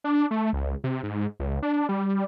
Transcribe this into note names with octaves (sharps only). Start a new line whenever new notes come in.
D4
A3
C#2
C3
G#2
C#2
D4
G3